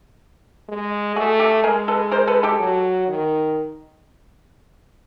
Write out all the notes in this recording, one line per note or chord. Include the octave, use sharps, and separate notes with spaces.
G#3
A3 F#4 G#4
G4 A4
G#3 G#4 A#4
A4 B4
A#4 C5
A4 B4
G4 A4
F#3
D#3